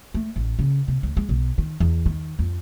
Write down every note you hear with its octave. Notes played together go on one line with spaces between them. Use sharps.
A3
A1
C#3
C3
D2
G#3
B1
D#3
E2
D#3
F2